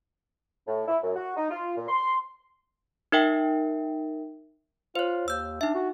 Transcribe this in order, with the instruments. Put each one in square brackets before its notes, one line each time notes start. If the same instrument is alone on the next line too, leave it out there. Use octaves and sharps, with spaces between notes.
[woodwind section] A2
E4
F#2
F#4
D#4
F4
A#2
C6
[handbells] D#4 A#4 E5 G5
[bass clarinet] F4 [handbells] C5 C#5
[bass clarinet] D#2 [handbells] E6 G6
[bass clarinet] D4 [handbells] D#4 E5
[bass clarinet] F#4